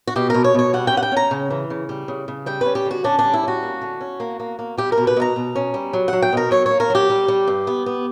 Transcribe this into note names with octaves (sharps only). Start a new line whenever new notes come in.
F#4
B2 G4
B2 A#4
C#5
B2 C#5
G3 F#5
G5
C#4
F#5
G5
C#4 A#5
C#3
E3
C#3
G3
C#3
C#3
G3 G5
C#4 B4
G4
D3 F#4
C#4 D4
D4
G3
E4
C#4 F#4
A#3
D3
C#4
A#3
A#3
A#3
G3 G4
A#4
B2
B4
B2 A#5
B2
C#4
G3
F#3
F#3 F#5
G5
B2 A#4
F#3 C#5
A#3 C#5
A#4
F#3 G4
G3
G3
G2
B3
B3